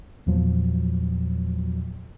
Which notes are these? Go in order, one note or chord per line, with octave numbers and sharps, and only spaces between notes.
E2 A#2 F3 F#3